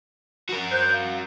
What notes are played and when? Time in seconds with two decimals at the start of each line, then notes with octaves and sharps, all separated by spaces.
0.49 F#4 A#4
0.71 C5 F#6 G6
0.93 F5